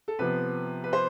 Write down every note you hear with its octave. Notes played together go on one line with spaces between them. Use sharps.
A4
C3 F3 B3 B4
B4
C5